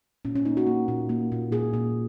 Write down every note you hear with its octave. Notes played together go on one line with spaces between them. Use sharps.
A#2 C#4
C#4
A#3 D#4
F#4
A#3
A#2
A#3
A#2
A#2 G#4
A#2